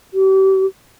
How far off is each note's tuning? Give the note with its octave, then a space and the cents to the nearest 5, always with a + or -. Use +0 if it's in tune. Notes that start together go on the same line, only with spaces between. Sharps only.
G4 -40